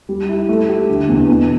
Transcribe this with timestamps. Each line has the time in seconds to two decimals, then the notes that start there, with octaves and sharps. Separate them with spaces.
0.09 G3
0.29 E4
0.49 A3
0.69 G4
0.89 D3
1.09 E2
1.28 B2